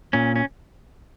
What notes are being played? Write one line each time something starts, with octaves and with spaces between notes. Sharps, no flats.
A#2 C#4
C#4